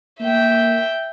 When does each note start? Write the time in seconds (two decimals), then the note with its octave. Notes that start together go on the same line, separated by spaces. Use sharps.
0.20 A#3 E5 G5